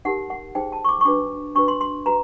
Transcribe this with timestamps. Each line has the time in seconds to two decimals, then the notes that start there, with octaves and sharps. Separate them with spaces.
0.05 D#4 G4 A#4 F#5
0.30 F#5
0.55 D#4 G#4 C5 G5
0.72 A5
0.84 C#6
0.89 D6
1.01 C#6
1.05 D4 F#4 B4 D6
1.55 D4 F#4 B4 C#6
1.68 C6
1.81 C6
2.06 F#4 B4 A#5